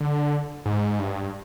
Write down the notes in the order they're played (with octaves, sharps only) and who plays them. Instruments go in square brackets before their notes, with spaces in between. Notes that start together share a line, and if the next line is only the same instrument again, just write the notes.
[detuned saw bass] D3
G#2
G2